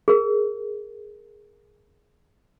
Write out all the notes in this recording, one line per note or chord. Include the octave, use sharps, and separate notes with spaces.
G#4 A#4